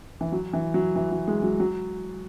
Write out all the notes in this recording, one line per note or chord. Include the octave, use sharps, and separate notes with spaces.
E3
F#3
E3
F#3
E3
F#3
G#3
F#3
F#3